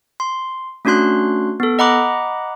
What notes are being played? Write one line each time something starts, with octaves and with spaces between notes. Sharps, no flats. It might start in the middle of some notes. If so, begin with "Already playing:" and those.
C6
A3 C#4 D4 F#4 C6 F#6
B3 A4
D#5 F#5 A#5 B5 D6 F#6